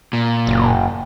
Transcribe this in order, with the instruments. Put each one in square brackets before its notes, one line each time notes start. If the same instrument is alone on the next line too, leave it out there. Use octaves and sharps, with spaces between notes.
[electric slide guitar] A#2
[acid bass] F#1